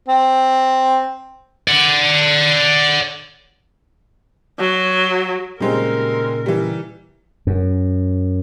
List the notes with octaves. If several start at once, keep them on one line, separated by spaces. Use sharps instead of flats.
C4
D5 F#5
F#3
A#2 C#3 G3 G#3 C4 D#4 A#4
E3 G3
F#2